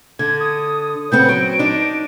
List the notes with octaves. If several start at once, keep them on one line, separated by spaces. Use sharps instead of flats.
D3 G#6
D#6
C#3 B3 C4 G6
F#3 D7
D4 D#4